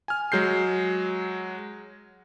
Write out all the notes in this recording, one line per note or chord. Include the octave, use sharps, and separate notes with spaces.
G#5 F6
F#3 G#3 G6 C7